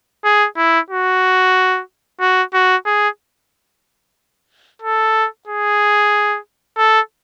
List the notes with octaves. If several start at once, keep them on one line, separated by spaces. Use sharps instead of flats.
G#4
E4
F#4
F#4
F#4
G#4
A4
G#4
A4